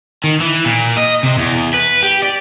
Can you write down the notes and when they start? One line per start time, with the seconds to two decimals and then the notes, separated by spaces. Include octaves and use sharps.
0.24 D#3
0.41 E3
0.65 A#2
0.97 D#5
1.23 C3
1.38 E2
1.74 B4
2.03 G4
2.22 D5